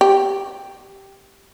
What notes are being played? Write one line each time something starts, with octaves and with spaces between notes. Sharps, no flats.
G4